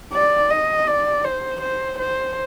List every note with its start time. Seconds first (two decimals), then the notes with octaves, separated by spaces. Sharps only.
0.13 D5
0.50 D#5
0.87 D5
1.24 C5
1.61 C5
1.99 C5